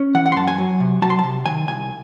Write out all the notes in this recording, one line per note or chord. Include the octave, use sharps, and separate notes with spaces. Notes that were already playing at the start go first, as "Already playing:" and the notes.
Already playing: C#4
E3 F#5
F#5
C6
F#2 A5
G#5
F#3
C3
F#3 A5
C6
A5
C3
D#3 G#5
C2 G#5